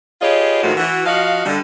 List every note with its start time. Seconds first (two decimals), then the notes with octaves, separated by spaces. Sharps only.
0.22 F4 G4 G#4 B4 C#5 D#5
0.64 A2 D#3 F3 G#3 A3 F#4
0.77 E3 F#4
1.06 F3 F#4 D#5 F5
1.46 D3 G3